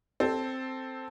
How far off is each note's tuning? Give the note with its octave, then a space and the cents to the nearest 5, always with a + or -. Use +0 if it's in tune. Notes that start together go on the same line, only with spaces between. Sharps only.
C4 +0 A4 +0